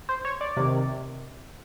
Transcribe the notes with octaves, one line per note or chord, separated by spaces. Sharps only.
C5
C#5
D5
C3 D#3